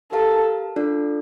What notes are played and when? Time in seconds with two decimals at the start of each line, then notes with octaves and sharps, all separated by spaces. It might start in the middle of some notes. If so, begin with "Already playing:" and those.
0.12 G4 A4 A#4 F5 A5
0.76 D4 F4 A4 D5